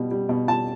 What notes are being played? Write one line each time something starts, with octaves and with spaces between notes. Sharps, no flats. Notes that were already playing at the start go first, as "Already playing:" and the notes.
Already playing: B2 G3
G3
B2
G3 A5